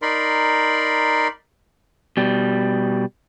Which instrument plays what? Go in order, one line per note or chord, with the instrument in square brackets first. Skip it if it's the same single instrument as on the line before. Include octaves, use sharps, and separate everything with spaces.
[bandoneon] D#4 A#4 D5 B5 C6
[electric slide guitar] B2 G3